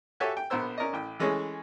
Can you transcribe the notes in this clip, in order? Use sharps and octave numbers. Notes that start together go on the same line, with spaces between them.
F#4 G4 A4 C#5 E5 G#5
G5
A#1 B3 A#4 C5 E6
C#4 A#4 D5 D#5
A1 G5
E3 G#3 A3 C#4 G#4 C#5